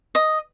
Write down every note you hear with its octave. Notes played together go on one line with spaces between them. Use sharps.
D#5